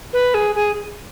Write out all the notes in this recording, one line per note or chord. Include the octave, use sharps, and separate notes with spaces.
B4
G#4
G#4